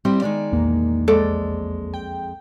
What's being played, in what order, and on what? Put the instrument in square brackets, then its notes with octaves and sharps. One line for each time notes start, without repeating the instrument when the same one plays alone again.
[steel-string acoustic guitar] G3 C4 E4
D#3 G#3 D5
[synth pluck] A#1 E2 A#3
[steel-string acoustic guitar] F2 G#3 [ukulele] A4 D5
[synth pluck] G5